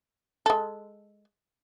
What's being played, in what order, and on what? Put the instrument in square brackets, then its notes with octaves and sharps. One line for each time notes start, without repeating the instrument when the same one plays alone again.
[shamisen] G#3 A4